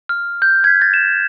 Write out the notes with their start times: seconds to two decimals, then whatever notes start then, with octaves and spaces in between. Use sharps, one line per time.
0.09 F6
0.42 G6
0.64 G#6 B6
0.82 A6
0.94 E7